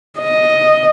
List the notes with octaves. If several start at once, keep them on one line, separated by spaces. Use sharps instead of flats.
D#5